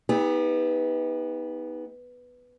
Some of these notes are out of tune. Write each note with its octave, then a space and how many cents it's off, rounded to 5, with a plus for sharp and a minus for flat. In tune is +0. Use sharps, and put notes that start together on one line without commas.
B3 +0 D#4 +35 G4 +45